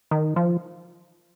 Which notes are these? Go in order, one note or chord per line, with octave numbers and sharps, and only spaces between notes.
D#3
F3